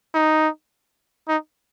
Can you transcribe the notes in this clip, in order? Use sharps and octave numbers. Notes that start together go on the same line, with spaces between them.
D#4
D#4